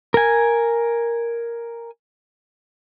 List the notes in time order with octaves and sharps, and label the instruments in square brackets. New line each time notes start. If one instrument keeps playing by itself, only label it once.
[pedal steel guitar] A#4 G#5